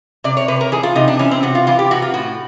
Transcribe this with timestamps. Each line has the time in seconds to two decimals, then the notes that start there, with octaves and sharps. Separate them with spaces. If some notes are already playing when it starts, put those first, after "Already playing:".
0.24 C3 D5
0.37 C#5
0.48 C3 B4
0.61 A#4
0.72 E3 G#4
0.83 F4
0.95 C3 D#4
1.08 D4
1.19 E3 C#4
1.31 C4
1.43 C3 F#4
1.55 F4
1.67 E3 F4
1.79 G4
1.91 C3 F#4
2.02 F4
2.14 A2 F#4